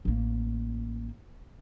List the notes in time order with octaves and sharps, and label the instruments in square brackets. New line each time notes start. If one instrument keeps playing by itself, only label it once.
[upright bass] A1 A#3